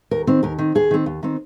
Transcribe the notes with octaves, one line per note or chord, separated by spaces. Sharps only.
D#2 A#4
D#3 C4
D#2 A#4
D#3 C4
D#2 G#4
D#3 C4
D#2
D#3 C4